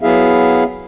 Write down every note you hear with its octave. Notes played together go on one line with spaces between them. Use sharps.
F#3 B3 E4 G#4 E5 F5